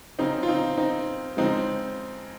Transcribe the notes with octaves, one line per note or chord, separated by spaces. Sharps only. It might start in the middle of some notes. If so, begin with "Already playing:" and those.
C#3 F#3 C4 D#4
F4
C4 D#4
C4 D#4
C#3 F3 G#3 C4 D#4